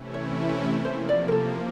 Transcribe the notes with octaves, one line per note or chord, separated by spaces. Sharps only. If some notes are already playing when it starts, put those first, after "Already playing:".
Already playing: C3 E3 A3 C#4 E4
C#5
C3 F3 A#3 C5
D5
A#4
A4